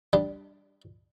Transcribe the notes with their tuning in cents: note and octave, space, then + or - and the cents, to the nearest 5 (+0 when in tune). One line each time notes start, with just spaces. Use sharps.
G3 +0 D4 +0